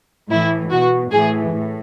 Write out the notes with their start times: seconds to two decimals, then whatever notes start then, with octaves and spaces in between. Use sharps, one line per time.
0.30 A2 E3 E4
0.71 B2 F#4
1.11 A2 E3 G#4
1.51 A2